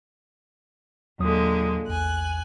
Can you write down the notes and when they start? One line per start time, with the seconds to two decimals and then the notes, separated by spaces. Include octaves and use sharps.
1.19 D#2 A#2 D3 F#3 G#3 D#6
1.88 A#1 E2 G#5 F#6